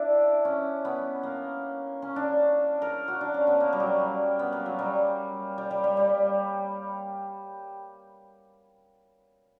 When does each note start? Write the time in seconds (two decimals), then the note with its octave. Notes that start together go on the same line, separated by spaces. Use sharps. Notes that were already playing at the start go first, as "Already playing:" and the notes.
Already playing: D4 E4
0.45 C#4
0.85 B3
1.23 A#3
2.02 C#4
2.16 D4
2.82 A#4
3.08 F#4
3.21 D4
3.34 C#4
3.47 B3
3.60 A#3
3.73 G3
3.80 F#3
4.00 G3
4.39 B3
4.53 A#3
4.66 F#3
4.79 G3
5.58 G3
5.71 G3
5.84 G3
5.97 G3